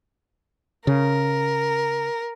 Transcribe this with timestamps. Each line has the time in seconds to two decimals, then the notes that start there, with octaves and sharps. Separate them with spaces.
0.87 C#3 A#4